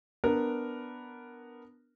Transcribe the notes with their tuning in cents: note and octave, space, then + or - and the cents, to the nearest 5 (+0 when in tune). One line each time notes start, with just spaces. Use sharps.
B3 +0 D4 +0 A#4 +0